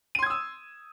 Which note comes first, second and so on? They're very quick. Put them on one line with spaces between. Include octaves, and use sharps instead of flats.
D#7 C6 G#6 D#6 E6